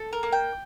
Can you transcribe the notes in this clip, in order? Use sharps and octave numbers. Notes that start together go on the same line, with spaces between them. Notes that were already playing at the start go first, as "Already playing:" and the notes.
Already playing: A4
A#4
A#3
G5